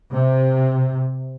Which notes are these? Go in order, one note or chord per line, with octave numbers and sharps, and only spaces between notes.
C3